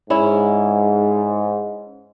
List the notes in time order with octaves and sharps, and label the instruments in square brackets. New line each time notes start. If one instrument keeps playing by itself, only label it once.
[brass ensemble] G#2 [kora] C#4 E4